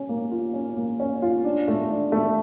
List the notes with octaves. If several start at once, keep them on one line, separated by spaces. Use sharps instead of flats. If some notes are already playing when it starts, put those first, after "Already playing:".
Already playing: C#4
A#3
F4
C#4
A#3
C#4
F4
D4
A3
D4
A3